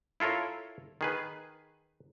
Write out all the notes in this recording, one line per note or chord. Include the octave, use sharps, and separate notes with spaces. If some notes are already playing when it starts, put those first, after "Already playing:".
E4 F4 A4 A#4 C#5
D#3 G#4 B4